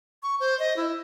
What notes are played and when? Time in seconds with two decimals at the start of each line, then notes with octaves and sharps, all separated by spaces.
0.23 C#6
0.40 C5
0.59 D#5
0.76 E4